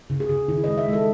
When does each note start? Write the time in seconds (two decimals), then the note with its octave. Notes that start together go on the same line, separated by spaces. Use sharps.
0.10 C#3
0.20 G#4
0.29 C#3
0.48 D#3 E4
0.64 D#5
0.68 G#3
0.78 E5
0.88 G#3 A4